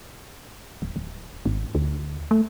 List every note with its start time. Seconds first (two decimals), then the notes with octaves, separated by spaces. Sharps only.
0.82 D1
0.96 D1
1.46 G#1
1.75 D2
2.31 A3